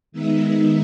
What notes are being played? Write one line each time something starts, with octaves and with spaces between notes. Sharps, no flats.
D#3 G#3 B3 D#4 E5